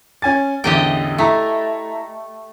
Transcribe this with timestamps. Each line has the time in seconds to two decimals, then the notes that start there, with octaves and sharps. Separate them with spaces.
0.22 C#4 G#5 A6
0.64 A1 E2 D3 G4 D#5 G5
1.18 A3 E4 E5 A#5